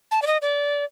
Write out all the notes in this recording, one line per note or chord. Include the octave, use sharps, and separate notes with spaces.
A5
D5
D#5
D5